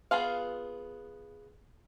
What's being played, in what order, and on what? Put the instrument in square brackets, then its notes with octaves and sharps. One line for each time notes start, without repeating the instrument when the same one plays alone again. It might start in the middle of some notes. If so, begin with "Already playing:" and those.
[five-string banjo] B3 F4 G#4 F5